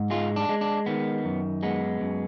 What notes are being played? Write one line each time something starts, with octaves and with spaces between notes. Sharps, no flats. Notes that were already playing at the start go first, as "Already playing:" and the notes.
Already playing: G#2
G#3 F4
D4
G#3
D4
D#3 B3
F#2
G#3 B3
F#2